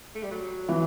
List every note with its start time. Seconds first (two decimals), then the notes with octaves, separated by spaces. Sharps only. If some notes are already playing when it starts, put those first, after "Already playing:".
0.15 A3
0.23 G3
0.31 F#3
0.68 E3 E4